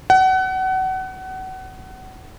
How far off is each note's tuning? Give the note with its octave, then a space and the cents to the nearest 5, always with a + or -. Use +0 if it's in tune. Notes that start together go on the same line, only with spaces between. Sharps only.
F#5 +30